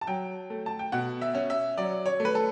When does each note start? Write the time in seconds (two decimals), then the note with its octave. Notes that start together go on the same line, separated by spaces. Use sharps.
0.01 A5
0.07 F#3 G5
0.50 A3
0.66 A5
0.79 G5
0.92 B2 F#5
1.21 E5
1.35 C#4
1.50 E5
1.78 F#3 D5
2.06 C#5
2.20 A3
2.25 B4
2.35 A4